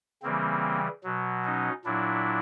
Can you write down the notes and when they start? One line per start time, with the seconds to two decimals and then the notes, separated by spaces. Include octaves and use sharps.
0.23 C#3 E3 G3 A#3 C4
1.04 B2 F#3
1.44 C#4 D#4
1.85 A#2 F#3 D4 E4